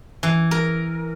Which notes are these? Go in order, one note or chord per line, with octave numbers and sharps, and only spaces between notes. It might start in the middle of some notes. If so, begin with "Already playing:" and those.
E3
A#4